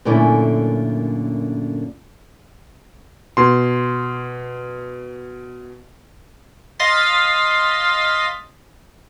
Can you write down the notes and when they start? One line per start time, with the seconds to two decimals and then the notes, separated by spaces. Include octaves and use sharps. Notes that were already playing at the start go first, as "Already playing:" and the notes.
0.05 F#2 A#2 D3 A3 C#4 E4
3.37 B2 C6
6.79 D#5 F5 C6 A6 B6